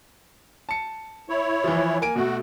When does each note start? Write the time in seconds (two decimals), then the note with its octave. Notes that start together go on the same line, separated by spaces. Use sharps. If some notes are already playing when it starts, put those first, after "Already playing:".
0.69 A5 C#7
1.29 E4 C#5
1.64 E3 F3
2.02 A#3 G#5 D7
2.16 B2 A3 F#4